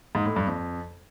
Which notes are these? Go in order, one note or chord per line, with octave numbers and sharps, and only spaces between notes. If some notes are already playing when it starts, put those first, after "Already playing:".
G#2
A2
G2
F2